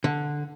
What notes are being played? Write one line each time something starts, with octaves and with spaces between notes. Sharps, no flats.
D3